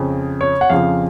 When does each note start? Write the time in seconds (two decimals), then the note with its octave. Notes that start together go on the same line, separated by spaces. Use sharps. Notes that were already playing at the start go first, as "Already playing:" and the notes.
Already playing: F2 C#3 F3
0.41 C#5
0.61 F#5
0.70 F2 C#3 F3 F5